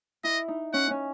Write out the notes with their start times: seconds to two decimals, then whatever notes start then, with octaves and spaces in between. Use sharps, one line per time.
0.24 E4 D#5
0.48 D#4
0.73 C#4 F#5
0.91 C#4